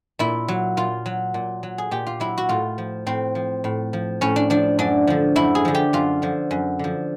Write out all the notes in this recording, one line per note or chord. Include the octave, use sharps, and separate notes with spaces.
A#2 E4
F#3
A#2 F4
F#3
A#2
F#3
G#4
A#2 G4
F4
F#3 E4
F#4
A2 F4
F3
A2 C4
F3
A2
F3
A2 C#4
D4
F3 D4
F#2 D4
D3 F3
F#2 E4
G#4
D3 F3
G4
F#2 F4
D3 F3
F#2
D3 F3